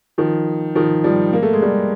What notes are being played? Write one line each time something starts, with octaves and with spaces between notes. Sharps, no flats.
D#3 F3
D#3 F3
F3 G3
A#3
A3
G#3
G3 A3